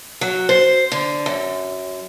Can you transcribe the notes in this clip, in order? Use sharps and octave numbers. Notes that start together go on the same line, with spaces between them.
F#3
C5
D3
F#2